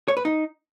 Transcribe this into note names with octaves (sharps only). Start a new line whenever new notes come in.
C#5
B4
D#4